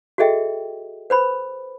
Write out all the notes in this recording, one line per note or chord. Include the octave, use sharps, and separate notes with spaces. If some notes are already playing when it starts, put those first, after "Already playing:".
F#4 G#4 A4 D#5 E5 G5
B4 C5 B5